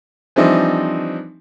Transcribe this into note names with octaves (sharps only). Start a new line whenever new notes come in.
E3 F3 G3 C4 D4 D#4